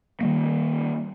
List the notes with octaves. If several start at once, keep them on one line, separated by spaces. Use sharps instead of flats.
D#3 G3 A#3